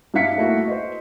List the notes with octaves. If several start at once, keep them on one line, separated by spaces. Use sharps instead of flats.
G2 D#4 E5 F5 B6 C#7
A3 A#3 E4 F#4
C5 D#5